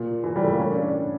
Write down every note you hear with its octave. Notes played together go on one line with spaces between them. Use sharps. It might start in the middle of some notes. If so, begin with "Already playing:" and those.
Already playing: A#2
E3
G3
A3
A#3
C#4
D4
D4